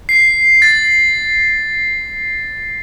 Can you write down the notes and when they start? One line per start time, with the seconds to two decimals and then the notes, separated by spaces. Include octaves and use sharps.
0.09 C7
0.62 A6